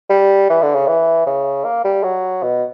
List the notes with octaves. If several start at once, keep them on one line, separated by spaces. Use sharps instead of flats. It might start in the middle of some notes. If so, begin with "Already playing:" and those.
G3
E3
D3
C#3
E3
C#3
A#3
G3
F#3
B2